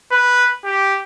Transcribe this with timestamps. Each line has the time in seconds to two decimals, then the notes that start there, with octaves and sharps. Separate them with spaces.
0.11 B4
0.64 G4